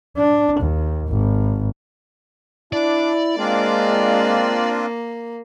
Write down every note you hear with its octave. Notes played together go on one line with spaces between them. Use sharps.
D4
D#2
G#1
D4 E4 D5
G#3 A#3 C4 D4 F4